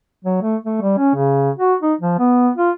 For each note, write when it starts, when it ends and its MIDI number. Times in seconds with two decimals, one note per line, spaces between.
0.25 0.38 54
0.43 0.56 57
0.65 0.78 57
0.82 0.96 55
0.98 1.13 61
1.15 1.50 49
1.58 1.74 66
1.82 1.94 63
2.01 2.16 53
2.19 2.50 59
2.58 2.71 65